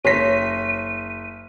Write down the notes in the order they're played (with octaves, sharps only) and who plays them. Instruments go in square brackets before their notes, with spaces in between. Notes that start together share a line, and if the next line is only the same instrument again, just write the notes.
[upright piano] F#1 B6 [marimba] C#5 [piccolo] D#7